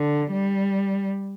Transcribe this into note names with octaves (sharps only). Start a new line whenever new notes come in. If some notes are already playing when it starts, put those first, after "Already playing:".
Already playing: D3
G3